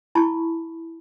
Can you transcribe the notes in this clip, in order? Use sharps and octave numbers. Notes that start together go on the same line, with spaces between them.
E4 A5 B5 C#6